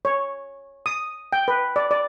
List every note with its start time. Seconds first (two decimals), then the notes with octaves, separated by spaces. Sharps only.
0.05 C#5
0.86 D#6
1.33 G5
1.48 B4
1.76 D5
1.91 D5